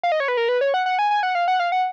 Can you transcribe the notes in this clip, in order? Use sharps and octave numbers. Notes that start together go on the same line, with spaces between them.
F5
D#5
C#5
B4
A#4
B4
C#5
F#5
F#5
G#5
G#5
F#5
F5
F#5
F5
F#5